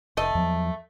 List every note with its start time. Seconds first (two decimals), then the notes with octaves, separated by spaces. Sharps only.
0.17 F1 A3 D#5
0.35 E2 F3 F#3